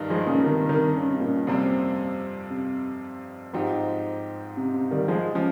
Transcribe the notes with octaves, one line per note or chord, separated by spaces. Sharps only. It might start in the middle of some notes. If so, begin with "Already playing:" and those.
Already playing: G2 D#3 G3 D#4
F3 G#3
A#2 C#3
C3 D#3
C3 D#3
C#3
C3
A#2 C#3
F2 C3 G3 C4
C3
G#2 F3 C4 D#4 G4
C3
C3
D#3 G3
F3 G#3
C#3 F3